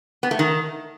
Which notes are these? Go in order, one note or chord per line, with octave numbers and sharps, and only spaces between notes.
B3
A3
D#3